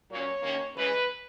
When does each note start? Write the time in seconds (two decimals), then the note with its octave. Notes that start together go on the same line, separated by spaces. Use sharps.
0.11 A#2 F#3 A#3 C#4 C#5
0.43 D#2 D#3 A#3 C#4
0.75 F#2 C#3 E3 G#3 B4